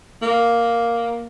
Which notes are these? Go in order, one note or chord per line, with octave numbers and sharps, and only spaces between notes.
A#3